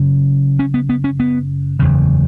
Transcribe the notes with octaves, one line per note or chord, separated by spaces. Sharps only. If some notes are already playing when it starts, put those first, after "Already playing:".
Already playing: F#1 F#2 C#3
C#4
B3
B3
C#4
B3
F#1 E2 C#3